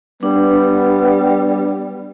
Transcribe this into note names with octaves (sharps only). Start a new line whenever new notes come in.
G3 B3 D4